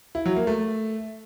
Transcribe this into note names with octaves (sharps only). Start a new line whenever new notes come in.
E4
F#3
A#3
A3